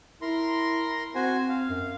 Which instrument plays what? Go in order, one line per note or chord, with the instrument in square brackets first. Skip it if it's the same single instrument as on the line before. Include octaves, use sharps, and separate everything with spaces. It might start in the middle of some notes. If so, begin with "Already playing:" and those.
[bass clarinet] E4 [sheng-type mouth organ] A#4 A#5 C6
[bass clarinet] C4 [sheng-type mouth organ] F#4 C5 G#5
[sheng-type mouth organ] F5
[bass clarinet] F#2